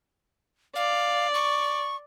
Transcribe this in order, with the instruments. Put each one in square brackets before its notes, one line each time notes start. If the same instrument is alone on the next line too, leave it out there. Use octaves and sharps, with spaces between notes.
[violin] D5 [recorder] F5
[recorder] C#6